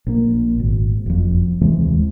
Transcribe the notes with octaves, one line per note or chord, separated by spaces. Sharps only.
A#1 A#3
G#1
F#1 F2
D#2 C3 E3 G#3